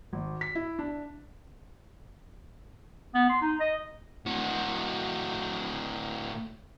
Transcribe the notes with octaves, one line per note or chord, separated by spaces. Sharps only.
G#1
B6
E4
D4
B3
C6
D#4
D#5
A2 F#4